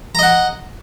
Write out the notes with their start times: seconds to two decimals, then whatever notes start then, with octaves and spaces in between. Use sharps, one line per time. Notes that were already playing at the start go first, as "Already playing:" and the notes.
0.15 A#5
0.19 D#5
0.23 F#5